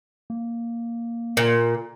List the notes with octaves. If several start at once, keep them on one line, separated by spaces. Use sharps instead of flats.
A#3
A#2